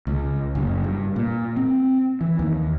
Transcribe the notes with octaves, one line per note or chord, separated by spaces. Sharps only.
C#2
F#1
G2
A#2
C4
E3
D#2